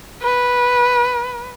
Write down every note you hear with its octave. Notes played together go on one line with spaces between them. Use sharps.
B4